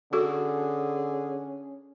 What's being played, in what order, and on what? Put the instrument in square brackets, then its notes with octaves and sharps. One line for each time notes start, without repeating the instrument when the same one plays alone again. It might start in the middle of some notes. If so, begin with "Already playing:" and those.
[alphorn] D3 [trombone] C#4 [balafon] F#4 A4 [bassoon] G#4